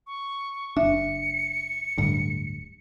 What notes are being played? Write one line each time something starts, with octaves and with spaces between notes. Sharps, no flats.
C#6
F#1 D4 E5 C#7
D1 D2 G2